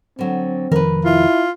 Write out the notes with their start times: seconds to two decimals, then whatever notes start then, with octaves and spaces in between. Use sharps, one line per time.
0.19 D3 F#3 C4
0.72 F1 D#3 F3 A#4 B4
1.05 E4 F4